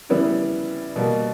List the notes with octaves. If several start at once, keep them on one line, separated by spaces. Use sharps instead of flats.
C#3 G3 B3 E4
B2 G3 A#3